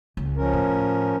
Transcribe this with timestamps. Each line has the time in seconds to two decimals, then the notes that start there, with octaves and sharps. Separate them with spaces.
0.17 C#2
0.36 F3 C#4 A#4
0.53 A2